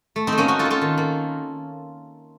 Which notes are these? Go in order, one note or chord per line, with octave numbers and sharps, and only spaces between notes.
A3
C4 D#4
A3
A#3 C#4
A#3 D#4 F#4
F4 A4
A#3
F4 A4
D#3
A#3